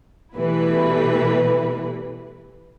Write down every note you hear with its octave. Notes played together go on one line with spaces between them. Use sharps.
B2 E3 G3 A3 E4 B4